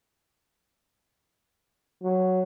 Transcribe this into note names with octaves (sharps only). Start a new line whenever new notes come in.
F#3